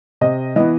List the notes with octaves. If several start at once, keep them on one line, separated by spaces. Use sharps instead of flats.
C3 D#5
E3 B3 D#5